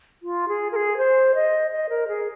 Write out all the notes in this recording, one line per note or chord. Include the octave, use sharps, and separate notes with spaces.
F4
G#4
A#4
G#4
C5
D#5
D#5
A#4
G#4